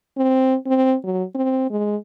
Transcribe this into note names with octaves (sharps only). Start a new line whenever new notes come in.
C4
C4
F#3
C4
G#3